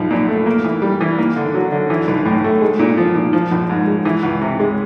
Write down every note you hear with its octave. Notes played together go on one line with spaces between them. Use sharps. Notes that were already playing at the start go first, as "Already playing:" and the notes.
Already playing: B1 F3
A#2
A3
A#3
E3
G3
E3
A#3
D3
F#3
D3
E3
B1
A2
A3
G#3
A#2
F3
A#2
F3
A#1
G#2
G#3
E3
C#2
C3
G#3